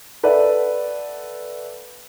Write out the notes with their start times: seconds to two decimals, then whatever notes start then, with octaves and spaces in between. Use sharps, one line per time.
0.23 A4 B4 D5 E5 F#5